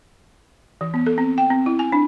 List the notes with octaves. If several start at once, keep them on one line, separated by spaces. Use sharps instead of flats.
E3
B3
A4
C4
G5
C4
E4
G#5
D4